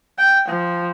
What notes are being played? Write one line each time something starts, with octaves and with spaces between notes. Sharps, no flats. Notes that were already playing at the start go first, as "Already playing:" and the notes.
G5
F3